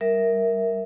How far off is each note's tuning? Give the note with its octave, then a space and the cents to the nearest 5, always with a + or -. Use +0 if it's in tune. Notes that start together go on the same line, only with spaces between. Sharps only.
G3 +0 A#4 +0 E5 -5